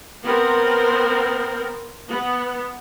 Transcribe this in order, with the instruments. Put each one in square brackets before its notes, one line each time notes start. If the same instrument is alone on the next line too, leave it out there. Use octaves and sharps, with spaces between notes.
[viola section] B3 C4 A#4
B3